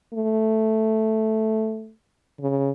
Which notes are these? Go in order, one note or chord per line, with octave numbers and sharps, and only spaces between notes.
A3
C#3